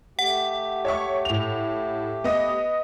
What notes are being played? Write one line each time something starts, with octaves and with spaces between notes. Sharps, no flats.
A3 G4 F#5
C#5 E5 C#6
A2 F7
B3 D#5